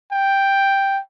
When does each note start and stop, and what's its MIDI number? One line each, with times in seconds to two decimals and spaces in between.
0.12 1.00 79